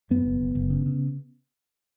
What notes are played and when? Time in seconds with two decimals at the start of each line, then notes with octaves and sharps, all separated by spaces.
0.10 F#2 B3
0.25 F#1
0.41 F#1
0.55 F#1
0.70 C#3
0.86 C#3